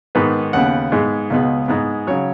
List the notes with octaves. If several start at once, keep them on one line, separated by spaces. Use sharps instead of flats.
G#2 D#3 B3 B4
D#2 C#3 B3 F#5
G#2 G#3 B3
C#2 B2 G#3 B3
G#2 G#3 B3
C#3 F#3 C#5